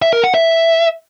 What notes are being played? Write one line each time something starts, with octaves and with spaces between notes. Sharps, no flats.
E5
A#4
F#5
E5